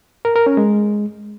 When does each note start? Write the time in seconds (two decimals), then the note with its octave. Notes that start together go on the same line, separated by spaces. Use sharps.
0.25 A#4
0.36 A#4
0.46 C#4
0.57 G#3